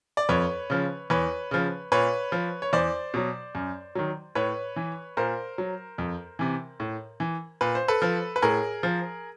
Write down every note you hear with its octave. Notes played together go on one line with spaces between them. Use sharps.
D5
F2 B4 C#5
C#3 F3
E2 B4 C#5
C#3 F3
A#2 B4 C#5
F3
C#5
E2 C5 D5
B2 F#3
F#2
D#3 F#3
A2 B4 C#5
E3
A#2 A#4 C5
F#3
F2
C3 E3
A2
E3
A#2 B4
C5
A4 B4
F3
B4
A2 G#4 A#4
F3